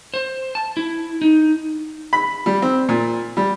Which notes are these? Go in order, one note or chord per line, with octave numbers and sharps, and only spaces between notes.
C5
A5
E4
D#4
B5
G3
C4
A#2
G3